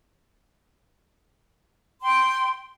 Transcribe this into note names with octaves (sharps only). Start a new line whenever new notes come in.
G5 C6